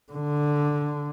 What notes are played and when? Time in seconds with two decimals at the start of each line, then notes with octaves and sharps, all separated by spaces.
0.13 D3